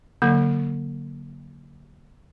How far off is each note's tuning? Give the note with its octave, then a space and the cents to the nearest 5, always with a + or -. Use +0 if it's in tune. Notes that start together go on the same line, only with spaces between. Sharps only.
D3 -25 F#3 +0 A#3 +0